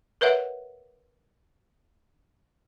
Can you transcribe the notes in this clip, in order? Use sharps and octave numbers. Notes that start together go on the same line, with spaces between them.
A#4 B4 C#5 E5 F#5